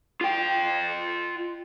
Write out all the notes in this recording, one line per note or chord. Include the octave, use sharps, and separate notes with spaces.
F4 G5